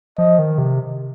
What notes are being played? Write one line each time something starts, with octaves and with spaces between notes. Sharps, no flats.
F3 D#5
D#3
C3